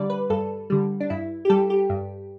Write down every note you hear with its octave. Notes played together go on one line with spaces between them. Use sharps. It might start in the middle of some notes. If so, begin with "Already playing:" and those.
Already playing: D3 G3 D5
B4
G2 A4
D3 G3
D4
G2 E4
G4
G3 A4
G4
G2